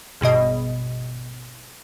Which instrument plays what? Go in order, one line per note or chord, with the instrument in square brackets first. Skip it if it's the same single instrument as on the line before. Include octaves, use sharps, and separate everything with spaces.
[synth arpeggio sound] G#1 G2 B2 D#5